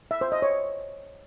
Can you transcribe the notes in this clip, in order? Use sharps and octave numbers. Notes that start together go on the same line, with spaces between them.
E5
C5
D#5
C#5